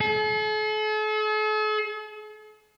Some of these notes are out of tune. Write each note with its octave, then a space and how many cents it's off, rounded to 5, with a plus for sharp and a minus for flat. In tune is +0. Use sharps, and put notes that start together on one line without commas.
A4 -45